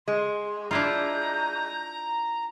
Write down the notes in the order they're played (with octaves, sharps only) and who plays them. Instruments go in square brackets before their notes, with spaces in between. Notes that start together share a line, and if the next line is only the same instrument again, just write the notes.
[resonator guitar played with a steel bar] G#3 [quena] C6
[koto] D4 E4 F4 [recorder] A#5 [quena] G6